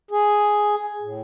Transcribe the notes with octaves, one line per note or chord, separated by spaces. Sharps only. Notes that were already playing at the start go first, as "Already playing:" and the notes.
G#4
A2